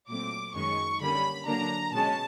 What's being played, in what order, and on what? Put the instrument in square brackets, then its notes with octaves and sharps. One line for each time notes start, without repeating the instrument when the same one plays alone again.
[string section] A#2 F#3 A3 C4 D6
F#2 D#3 G#3 C#4 C#6
D3 G3 A#3 C#4 B5
D3 F#3 A#3 D4 A#5
B2 G#3 C#4 A5